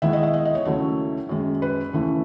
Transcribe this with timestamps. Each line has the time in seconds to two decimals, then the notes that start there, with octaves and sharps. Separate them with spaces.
0.02 D#2 D#3 G#3 B3 E4 E5
0.13 D#5
0.23 E5
0.34 D#5
0.45 D#5
0.55 C#5
0.65 D#2 C#3 F#3 A3 E4 C#5
1.29 F#2 D#3 G#3
1.62 B4
1.93 D#2 C#3 E3 A3